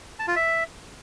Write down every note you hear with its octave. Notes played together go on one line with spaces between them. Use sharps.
A5
F4
E5